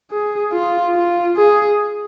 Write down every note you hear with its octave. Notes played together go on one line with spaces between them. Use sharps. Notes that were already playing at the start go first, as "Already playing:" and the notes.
G#4
F4
F4
G#4